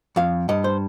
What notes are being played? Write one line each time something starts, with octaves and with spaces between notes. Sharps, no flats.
F2 F5
G2 D#5
C5